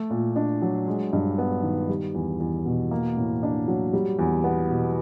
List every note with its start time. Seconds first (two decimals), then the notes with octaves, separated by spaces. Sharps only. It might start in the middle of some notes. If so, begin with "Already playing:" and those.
Already playing: A3
0.10 A#2
0.36 D4
0.62 F#3
0.87 G#3
1.13 G2
1.38 B3
1.63 D#3
1.89 G3
2.15 E2
2.40 E2
2.65 B2
2.91 A#3
3.17 A2
3.43 D4
3.68 F#3
3.93 G3
4.19 E2
4.44 B3
4.70 B2